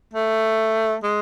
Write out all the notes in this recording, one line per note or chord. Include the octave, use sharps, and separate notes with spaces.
A3
G#3